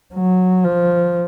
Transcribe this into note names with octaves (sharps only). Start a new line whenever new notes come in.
F#3
F3